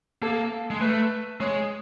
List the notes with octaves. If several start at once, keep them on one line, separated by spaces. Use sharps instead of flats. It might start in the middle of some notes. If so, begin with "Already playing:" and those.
A#3 A4
G#3
A3 B4
G#3 C#5